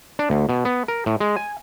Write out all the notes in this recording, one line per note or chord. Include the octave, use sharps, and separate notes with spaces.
D4
D2
B2
B3
A#4
A2
G#3
G#5